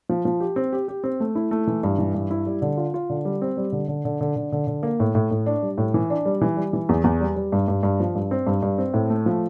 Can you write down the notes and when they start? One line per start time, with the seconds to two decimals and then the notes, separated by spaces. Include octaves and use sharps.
0.09 F3
0.25 F3
0.40 G4
0.56 C4
0.73 G4
0.88 G4
1.04 C4
1.20 A3
1.35 E4
1.51 A3
1.67 E3
1.83 G2
1.99 E3
2.14 G2
2.31 E4
2.46 G3
2.62 D3
2.77 F4
2.94 F4
3.10 D3
3.25 G3
3.42 C4
3.57 G3
3.72 D3
3.88 D3
4.05 D3
4.21 D3
4.36 D3
4.52 D3
4.67 D3
4.83 A#3
5.00 A2
5.15 A2
5.31 A2
5.46 D4
5.63 G3
5.78 A2
5.94 E3
6.10 D4
6.25 G3
6.41 E3
6.57 G3
6.73 E3
6.89 E2
7.04 E2
7.21 G3
7.36 G3
7.52 G2
7.68 G2
7.83 G2
8.00 F3
8.15 G2
8.31 C4
8.47 G2
8.62 G2
8.78 C4
8.94 A2
9.10 A3
9.26 F3